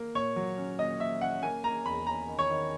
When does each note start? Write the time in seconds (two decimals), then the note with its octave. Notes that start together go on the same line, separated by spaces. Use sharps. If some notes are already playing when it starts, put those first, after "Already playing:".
Already playing: A#3
0.15 A#2 C#5
0.36 F#3
0.58 C#4
0.79 A#2 D#5
1.00 A#2 E5
1.21 C#4 F#5
1.43 A#3 G#5
1.64 A#3 A#5
1.85 E2 B5
2.07 A#3 A#5
2.28 D#3
2.39 C#5
2.50 D#3